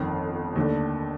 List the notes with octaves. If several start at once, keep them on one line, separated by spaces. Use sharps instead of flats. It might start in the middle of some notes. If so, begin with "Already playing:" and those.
Already playing: G1 F2 D#3
D#2 D3 A3